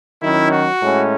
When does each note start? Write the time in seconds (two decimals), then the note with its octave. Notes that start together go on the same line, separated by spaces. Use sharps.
0.21 D#3 F#3 C#4 E4
0.52 F#4
0.81 A2 G#3 C#4